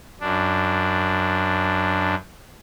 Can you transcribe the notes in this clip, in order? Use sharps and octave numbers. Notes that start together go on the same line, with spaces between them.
F#2 D4